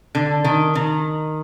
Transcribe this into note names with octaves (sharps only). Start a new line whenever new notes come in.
D3
D#3
D#3